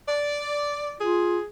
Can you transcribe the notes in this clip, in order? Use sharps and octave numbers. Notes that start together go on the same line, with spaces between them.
D5
F4 G#4